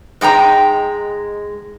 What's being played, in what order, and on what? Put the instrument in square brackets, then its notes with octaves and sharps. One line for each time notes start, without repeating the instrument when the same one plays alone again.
[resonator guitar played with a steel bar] G#2 G#3 G5 A#5